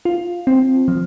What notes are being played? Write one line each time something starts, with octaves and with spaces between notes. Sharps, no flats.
F4
C4
F3